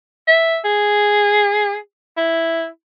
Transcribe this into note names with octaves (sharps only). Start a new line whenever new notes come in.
E5
G#4
E4